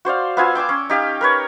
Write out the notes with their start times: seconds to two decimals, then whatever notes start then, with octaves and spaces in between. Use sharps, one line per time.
0.05 F#4 C5 D5 F5
0.37 B3 F4 G#5 E6
0.55 G5 C6 D6 E6
0.69 C#4
0.90 D#4 G4 F5 G5
1.21 A#4 B4 C#5